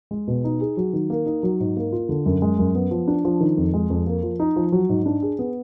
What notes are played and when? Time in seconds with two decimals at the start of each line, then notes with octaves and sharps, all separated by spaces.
0.11 G#3
0.27 B2
0.44 D#4
0.61 G#4
0.77 F#3
0.93 D#3
1.10 A#3
1.26 D#4
1.43 F#3
1.60 G#2
1.77 A#3
1.92 F4
2.09 D3
2.26 F#2
2.42 G#3
2.59 F#2
2.75 B3
2.91 F3
3.08 D4
3.25 F3
3.41 D#3
3.57 F2
3.74 G#3
3.90 F2
4.07 A#3
4.23 F3
4.40 D#4
4.56 F3
4.72 F#3
4.89 G#2
5.06 D4
5.22 G#4
5.39 B3